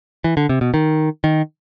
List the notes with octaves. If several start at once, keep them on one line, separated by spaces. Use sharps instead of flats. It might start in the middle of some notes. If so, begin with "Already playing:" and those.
E3
D3
C3
B2
D#3
D#3